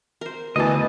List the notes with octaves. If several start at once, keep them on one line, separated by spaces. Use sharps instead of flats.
A#4 C5
D2 B2 E3 D#5 G#5 A5 D6